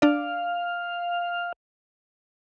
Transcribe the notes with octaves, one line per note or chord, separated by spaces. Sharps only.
D4 D5 F5